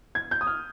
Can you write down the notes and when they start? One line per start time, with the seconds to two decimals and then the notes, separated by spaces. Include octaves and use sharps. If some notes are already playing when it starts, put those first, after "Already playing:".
0.15 G#6
0.31 G6
0.41 D#6
0.47 F6